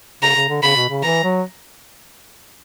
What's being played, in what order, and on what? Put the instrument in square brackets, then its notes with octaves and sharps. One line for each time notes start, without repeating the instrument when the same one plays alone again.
[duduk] C#3 [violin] A#5
[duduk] C#3
D3
[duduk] C#3 [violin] B5
[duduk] B2
C#3
[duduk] E3 [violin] A#5
[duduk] F#3